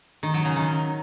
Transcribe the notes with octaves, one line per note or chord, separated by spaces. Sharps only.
D#3
F#3
C#3
D#3